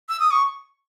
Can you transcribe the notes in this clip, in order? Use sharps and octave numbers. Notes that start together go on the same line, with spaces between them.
E6
D#6
C#6